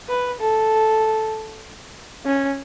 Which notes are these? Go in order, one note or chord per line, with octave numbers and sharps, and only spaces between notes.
B4
A4
C#4